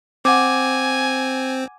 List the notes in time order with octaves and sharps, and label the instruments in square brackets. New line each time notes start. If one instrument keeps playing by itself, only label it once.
[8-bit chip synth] C4 [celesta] F#5 D6 [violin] G#5